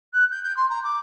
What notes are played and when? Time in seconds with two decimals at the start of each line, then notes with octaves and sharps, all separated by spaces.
0.14 F#6
0.31 G6
0.43 G6
0.57 C6
0.69 A#5
0.84 D6